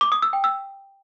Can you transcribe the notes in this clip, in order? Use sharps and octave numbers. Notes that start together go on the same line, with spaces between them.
D6
D#6
E6
G5
E6